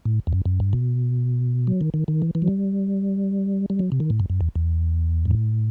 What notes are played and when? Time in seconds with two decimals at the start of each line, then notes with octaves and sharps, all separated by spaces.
0.05 A2
0.27 E2
0.33 F#2
0.46 F#2
0.60 G2
0.73 B2
1.67 F#3
1.81 D#3
1.94 D#3
2.08 D#3
2.22 E3
2.35 E3
2.42 F#3
2.48 G3
3.70 G3
3.79 F#3
3.92 C3
4.00 D#3
4.10 A2
4.20 F#2
4.30 F#2
4.41 E2
4.55 E2
5.25 G2
5.31 A2